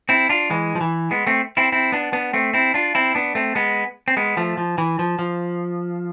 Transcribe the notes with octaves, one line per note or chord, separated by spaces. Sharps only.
C4 E4
D4 F4
E3 G#3
F3
E3
G#3 B3
A3 C4
C4 E4
C4 E4
B3 D4
B3 D4
A3 C4
C4 E4
D4 F4
C4 E4
B3 D4
A3 C4
G#3 B3
C4
G#3 B3
F3 A3
F3
E3
F3
F3